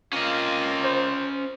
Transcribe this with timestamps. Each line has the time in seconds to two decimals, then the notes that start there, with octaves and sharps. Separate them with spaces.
0.13 A#3 C4 C#4 F4 D#5
0.84 C5